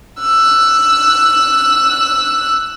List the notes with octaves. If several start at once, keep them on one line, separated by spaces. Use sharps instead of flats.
E6 F#6